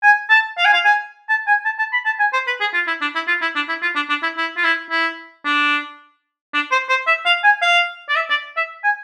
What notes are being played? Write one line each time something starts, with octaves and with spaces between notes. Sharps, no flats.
G#5
A5
F5
G#5
F5
G#5
A5
G#5
A5
A5
B5
A5
G#5
C5
B4
G#4
F4
E4
D4
E4
F4
E4
D4
E4
F4
D4
D4
E4
E4
F4
E4
E4
D4
D4
C5
C5
E5
F5
G#5
F5
D5
E5
D5
E5
G#5